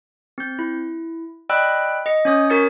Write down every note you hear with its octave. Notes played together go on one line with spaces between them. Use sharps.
C4 G6
E4
D5 D#5 G5 B5 E6 F#6
D#5 C#7
C#4 C#5 D#6 G6
F#4 A#4 C#5 A6 C#7